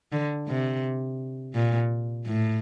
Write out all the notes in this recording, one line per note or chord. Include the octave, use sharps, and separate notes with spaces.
D3
C3
A#2
A2